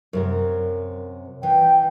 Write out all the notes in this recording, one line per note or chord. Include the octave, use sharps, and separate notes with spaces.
F#2 C3 A#4
E3 G5